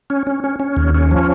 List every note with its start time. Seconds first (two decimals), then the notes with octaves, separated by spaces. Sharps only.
0.10 C#4
0.27 C#4
0.44 C#4
0.60 C#4
0.76 D#2
0.94 C#4
1.11 F3